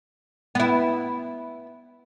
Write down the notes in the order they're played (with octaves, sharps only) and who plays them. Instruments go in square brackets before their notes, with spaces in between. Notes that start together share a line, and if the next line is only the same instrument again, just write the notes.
[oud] B3 E4